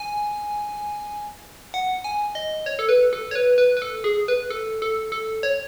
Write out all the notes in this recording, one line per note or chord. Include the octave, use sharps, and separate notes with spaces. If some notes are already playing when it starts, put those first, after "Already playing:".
Already playing: G#5
F#5
G#5
D#5
C#5
A4
B4
A4
C#5
B4
B4
B4
A4
G#4
B4
A4
A4
A4
C#5